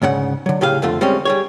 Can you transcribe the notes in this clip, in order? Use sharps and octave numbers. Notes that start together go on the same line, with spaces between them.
D2 G#2 C#3 F#5
D3 F#3
A2 C#3 G4 G#4 F5
F2 D3 A3 F4
G3 G#3 C4 C#4
G3 G#4 C#5